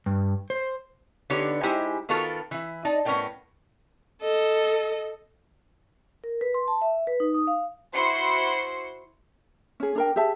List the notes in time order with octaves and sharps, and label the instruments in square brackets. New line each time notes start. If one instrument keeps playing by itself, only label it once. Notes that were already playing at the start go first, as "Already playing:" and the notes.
[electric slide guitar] G2
C5
[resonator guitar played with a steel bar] D3 B3 D#4 G4 C#5
G#3 D#4 E4 G4 C5 G#5
D#3 B3 F4 F#4 A4 A#4
E3 E4
D#4 D5 D#5 A5
A2 B3 C#4 A#4 D5 G5
[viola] A4 D#5
[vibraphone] A#4
B4
C6
A5
E5
B4
D#4
D#6
F5
[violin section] E4 F#4 C5 C6 C7 C#7
[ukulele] C#4 G#4
D4 A#4 G5
G4 G#4 E5 A5